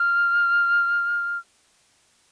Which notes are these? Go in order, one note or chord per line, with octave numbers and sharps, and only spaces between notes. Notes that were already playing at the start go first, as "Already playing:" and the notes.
Already playing: F6